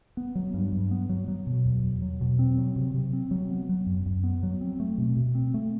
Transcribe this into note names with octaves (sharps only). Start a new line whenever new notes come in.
B3
F#3
G2
G2
B3
F#3
F#3
B2
E2
E2
F#3
B2
C4
F#3
C3
C3
C4
F#3
B3
F#3
F#2
F#2
B3
F#3
C4
A3
B2
B2
C4
A3